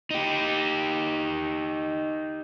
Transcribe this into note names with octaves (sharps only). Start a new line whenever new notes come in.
D#4 G4